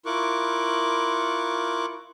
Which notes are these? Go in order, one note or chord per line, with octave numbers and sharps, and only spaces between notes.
E4 F4 A#4 C#6 D6 F#6